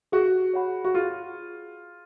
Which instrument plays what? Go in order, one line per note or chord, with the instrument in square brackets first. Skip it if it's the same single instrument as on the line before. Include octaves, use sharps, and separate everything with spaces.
[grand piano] F#4 [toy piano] G#4
[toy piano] C#5 F#5 B5
[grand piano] F#4
[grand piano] F4 [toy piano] G#4